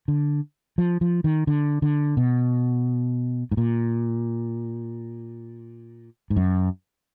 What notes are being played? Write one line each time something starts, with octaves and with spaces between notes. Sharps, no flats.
D3
F3
F3
D#3
D3
D3
B2
G#2
A#2
G#2
F#2